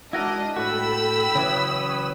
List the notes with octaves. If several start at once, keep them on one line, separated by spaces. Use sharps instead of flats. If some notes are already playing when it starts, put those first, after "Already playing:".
G#3 D4 E4 F#4 A#4 D#5
A2 F#4 A4 G5 B5 E6
C#3 E3 F#3 C#5 D#6